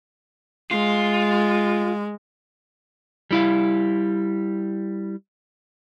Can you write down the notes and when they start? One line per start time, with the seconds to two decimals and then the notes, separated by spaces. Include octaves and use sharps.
0.71 G#3 F4
3.31 G3 E4 F5